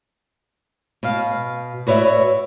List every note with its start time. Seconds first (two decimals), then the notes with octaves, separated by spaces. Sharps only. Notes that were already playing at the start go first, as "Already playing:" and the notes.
1.03 B2 F5
1.87 F#4 B4 C#5 D5 E5